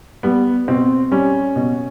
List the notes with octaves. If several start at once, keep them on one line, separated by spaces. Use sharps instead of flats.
G3 B3
B2 C4
G3 C#4
B2